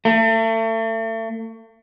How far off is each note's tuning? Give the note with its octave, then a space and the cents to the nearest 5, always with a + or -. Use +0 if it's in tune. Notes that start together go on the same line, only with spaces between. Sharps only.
A3 +35